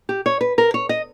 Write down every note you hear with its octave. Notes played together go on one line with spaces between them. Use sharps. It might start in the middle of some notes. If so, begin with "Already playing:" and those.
G4
C#5
B4
A#4
C#5
D#5